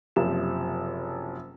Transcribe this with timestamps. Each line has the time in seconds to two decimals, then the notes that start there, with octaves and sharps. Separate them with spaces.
0.16 F#1 C3 F3 E7